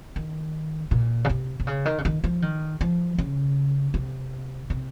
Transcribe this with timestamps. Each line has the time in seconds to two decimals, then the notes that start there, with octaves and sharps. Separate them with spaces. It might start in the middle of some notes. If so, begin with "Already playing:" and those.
0.16 D#3
0.91 A#2
1.25 C#3
1.29 C3
1.60 C3
1.67 C#3
1.85 D#3
1.98 C#3
2.05 D#3
2.24 F3
2.42 D#3
2.81 F3
3.18 C#3
3.94 C3
4.70 C3